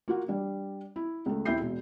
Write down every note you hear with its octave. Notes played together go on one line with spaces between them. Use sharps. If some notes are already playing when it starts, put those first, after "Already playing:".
A#3 F4 F#4
G3 D4
E4
C#2 A3
D#2 C4 E4 E5 G6 C7
E1